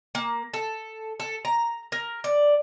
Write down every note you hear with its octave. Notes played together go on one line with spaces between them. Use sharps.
A#3
A4
A4
A#5
A#4
D5